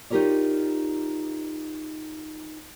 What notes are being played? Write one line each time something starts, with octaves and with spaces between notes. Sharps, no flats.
D#4 F4 G4 A#4 C#5 D5